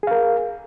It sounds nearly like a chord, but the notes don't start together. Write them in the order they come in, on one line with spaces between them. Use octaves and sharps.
G#4 F5 A#4